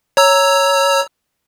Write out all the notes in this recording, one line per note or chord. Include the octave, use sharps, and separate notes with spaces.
C#5 A#5 E6